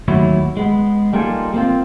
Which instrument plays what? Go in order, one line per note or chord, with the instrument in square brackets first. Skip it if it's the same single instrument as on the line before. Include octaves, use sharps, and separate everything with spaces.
[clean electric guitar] D#2 A2 F#3 E4 F#4 C#5
G#3 B3
G3 A#3 D#4 F4 G#4 A4
A#3 C4 F4